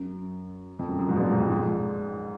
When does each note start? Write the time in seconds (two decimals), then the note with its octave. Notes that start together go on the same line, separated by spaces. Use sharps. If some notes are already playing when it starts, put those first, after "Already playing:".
Already playing: F#2
0.79 F2
0.89 F#2
0.99 F#2
1.09 G#2
1.16 B2
1.20 A#2
1.30 G#2
1.40 F2
1.50 G#2